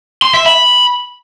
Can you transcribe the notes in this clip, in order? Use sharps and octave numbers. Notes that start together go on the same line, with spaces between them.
C6
E5
B5